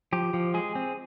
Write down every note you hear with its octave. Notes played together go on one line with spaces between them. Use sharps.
F3 G4
F3
G#3 G#4
C4